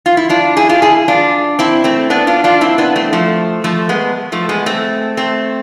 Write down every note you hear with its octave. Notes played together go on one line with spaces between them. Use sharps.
F4
E4
D4 F4
E4 G#4
D4 F4
E4 G#4
D4 F4
C4 E4
A3 C4
B3 D4
D4 F4
D4 F4
C4 E4
B3 D4
A3 C4
F3 A3
F3 A3
G#3 B3
F3 A3
G#3 B3
A3 C4
A3 C4